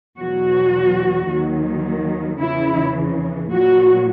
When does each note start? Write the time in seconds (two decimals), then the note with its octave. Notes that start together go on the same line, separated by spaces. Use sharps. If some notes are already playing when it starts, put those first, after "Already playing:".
0.19 E2 B2 F#3 F#4
1.29 D#2 D#3 F#3
2.40 E2 C#3 E3 E4
3.51 A#2 F#3 F#4